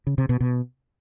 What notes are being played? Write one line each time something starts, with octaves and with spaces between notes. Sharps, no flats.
C#3
C3
B2
B2